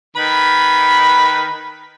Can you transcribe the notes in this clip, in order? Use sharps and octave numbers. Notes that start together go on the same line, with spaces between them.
D#3 B4 B5